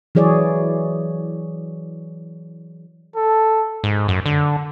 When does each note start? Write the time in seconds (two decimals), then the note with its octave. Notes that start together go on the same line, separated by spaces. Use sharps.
0.15 E3 F#3 G#4 C#5 D5
3.15 A4
3.84 G#2
4.08 F#2
4.26 D3